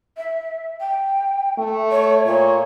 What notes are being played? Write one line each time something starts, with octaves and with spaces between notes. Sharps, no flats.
E5
G5
A3
C#5
A#2 C#5